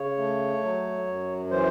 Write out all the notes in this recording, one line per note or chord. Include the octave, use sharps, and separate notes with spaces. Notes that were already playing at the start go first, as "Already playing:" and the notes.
Already playing: C#3 C#5
A3
F#3
F#2
E3 C5